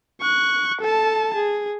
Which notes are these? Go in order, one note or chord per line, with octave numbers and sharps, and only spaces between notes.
C#6 F#6
A4 A5
G#4